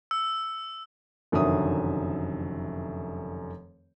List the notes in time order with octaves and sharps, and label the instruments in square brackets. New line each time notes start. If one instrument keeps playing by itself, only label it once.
[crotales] E6
[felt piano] F1 F#2 D3 D#3 E5 D#6